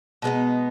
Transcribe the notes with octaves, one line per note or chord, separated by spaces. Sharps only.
B2 G#3 B3 D#4